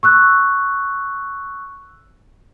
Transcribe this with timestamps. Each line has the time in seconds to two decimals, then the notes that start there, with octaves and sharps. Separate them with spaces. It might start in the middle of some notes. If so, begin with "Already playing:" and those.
0.03 C#6 E6 F#6